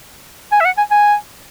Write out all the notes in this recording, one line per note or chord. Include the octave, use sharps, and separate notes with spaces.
G#5
E5
F#5
G#5
G#5